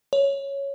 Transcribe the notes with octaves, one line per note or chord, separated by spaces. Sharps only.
C#5